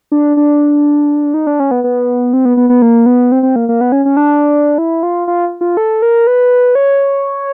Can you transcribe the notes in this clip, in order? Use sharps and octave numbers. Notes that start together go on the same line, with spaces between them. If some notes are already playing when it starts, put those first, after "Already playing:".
D4
D4
D#4
D4
C#4
B3
B3
C4
B3
B3
B3
A#3
B3
C4
C4
A#3
A#3
B3
C#4
C#4
D4
E4
F4
F4
F4
A4
A#4
B4
C#5